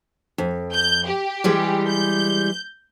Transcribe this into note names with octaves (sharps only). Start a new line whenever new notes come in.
F2
G6
G4
E3 G3 G#3
G6